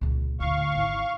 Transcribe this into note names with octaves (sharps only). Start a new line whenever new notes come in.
C#2 A#2
D2 A2 F5 C#6
G#1 E4